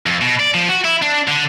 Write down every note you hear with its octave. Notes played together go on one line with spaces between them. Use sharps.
F2
B2
D5
F3
F#4
E4
D4
D3